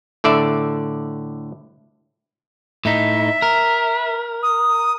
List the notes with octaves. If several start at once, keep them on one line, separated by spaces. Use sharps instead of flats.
A2 D3 D5 E5
A2 D#4 E5
A#4
D#6